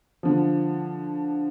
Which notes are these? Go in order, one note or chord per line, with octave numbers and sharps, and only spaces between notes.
D3 F3